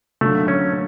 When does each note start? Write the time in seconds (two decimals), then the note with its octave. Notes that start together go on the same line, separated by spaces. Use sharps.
0.21 D3 F#3 A3 A#3
0.48 C#4